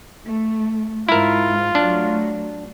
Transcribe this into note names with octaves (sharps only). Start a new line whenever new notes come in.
A3
G#2 E4 F4 A#4
F#3 A3 D4